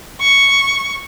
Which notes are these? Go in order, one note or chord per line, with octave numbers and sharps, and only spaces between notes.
C#6